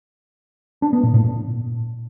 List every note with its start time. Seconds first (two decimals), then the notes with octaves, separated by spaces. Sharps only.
0.82 D4
0.93 B3
1.03 A#2
1.14 A2
1.25 A#2